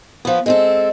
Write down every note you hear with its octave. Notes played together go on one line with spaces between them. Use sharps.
F3 B3
G#3 C4 A4